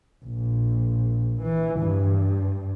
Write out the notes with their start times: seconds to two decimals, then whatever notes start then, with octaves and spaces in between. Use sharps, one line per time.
0.24 A#1
1.42 E3
1.80 G2